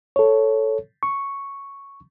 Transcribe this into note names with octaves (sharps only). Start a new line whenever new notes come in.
A4 C#5
C#6